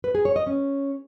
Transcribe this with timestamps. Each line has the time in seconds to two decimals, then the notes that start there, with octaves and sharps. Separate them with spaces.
0.04 B4
0.15 G#4
0.25 C#5
0.36 D#5
0.47 C#4